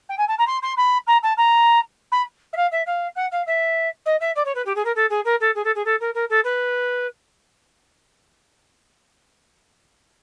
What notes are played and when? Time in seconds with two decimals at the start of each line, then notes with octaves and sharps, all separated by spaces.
0.09 G5
0.18 G#5
0.28 A5
0.38 A#5
0.47 C6
0.62 C6
0.77 B5
1.07 A#5
1.23 A5
1.37 A#5
2.12 B5
2.53 E5
2.56 F5
2.72 E5
2.86 F5
3.16 F#5
3.32 F5
3.47 E5
4.06 D#5
4.20 E5
4.36 D5
4.45 C#5
4.55 B4
4.66 G4
4.75 G#4
4.85 A#4
4.96 A4
5.10 G#4
5.25 A#4
5.40 A4
5.55 G#4
5.64 A4
5.75 G#4
5.85 A4
6.00 A#4
6.14 A#4
6.30 A4
6.44 B4